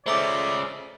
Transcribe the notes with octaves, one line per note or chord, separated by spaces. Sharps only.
G#3 A3 C#4 C5 D5 E5 A#5 D6